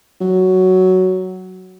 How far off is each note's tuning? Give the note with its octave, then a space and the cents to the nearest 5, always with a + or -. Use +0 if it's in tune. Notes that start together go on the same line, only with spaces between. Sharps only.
F#3 +5